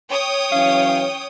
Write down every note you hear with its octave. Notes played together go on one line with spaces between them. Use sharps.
C#5 G5 D#6
E3 F#3 C#4 F5